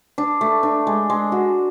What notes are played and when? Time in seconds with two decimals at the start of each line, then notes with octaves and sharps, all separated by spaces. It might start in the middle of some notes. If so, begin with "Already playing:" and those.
0.18 D4
0.41 A3
0.63 D4
0.87 G#3
1.10 G#3
1.32 F#4